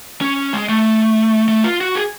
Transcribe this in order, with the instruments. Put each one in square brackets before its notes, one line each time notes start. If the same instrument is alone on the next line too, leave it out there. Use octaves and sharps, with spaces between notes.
[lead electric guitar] C#4
G#3
A3
A3
F4
F#4
G#4